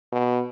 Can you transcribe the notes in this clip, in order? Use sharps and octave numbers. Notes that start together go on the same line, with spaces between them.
B2